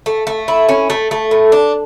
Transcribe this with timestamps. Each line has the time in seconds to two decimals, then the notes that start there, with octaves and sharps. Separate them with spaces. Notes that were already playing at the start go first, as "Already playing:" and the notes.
0.06 A3
0.27 A3
0.48 E4
0.69 C#4
0.90 A3
1.11 A3
1.31 A2
1.52 D4